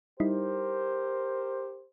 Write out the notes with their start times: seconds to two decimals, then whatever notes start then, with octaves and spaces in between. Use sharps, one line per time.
0.20 G3 D#4 E4 G4 A#4 C5